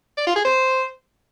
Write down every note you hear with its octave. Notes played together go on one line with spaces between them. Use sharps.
D5
F4
G#4
C5